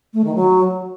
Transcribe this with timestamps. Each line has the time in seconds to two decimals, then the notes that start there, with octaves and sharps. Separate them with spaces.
0.14 A3
0.24 D#3
0.35 F#3